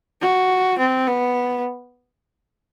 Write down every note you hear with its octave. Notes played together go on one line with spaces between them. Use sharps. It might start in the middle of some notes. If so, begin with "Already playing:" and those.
F#4
C4
B3